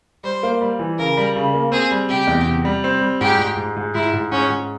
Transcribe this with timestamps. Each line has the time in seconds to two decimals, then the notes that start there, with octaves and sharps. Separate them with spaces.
0.24 G3 C5
0.43 A#3
0.61 G3
0.79 E3
0.99 C#3 A#4
1.17 G3
1.36 C#3
1.54 A#3
1.72 C4 G#4
1.91 G3
2.09 C3 G4
2.27 E2
2.47 C3
2.65 G3
2.84 C4
3.01 G3
3.20 G#2 G4
3.39 G#2
3.57 G#2
3.76 G#2
3.94 G#2 E4
4.13 G#2
4.32 G#2 C#4
4.50 G#2